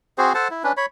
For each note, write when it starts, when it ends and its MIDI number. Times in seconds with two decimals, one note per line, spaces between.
0.18 0.33 60
0.18 0.33 66
0.18 0.33 68
0.18 0.33 72
0.34 0.48 69
0.34 0.48 72
0.34 0.48 78
0.34 0.48 81
0.51 0.63 64
0.64 0.72 61
0.64 0.72 62
0.64 0.72 71
0.77 0.86 73
0.77 0.86 83